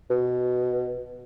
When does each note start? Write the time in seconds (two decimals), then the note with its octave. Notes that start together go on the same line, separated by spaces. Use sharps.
0.10 B2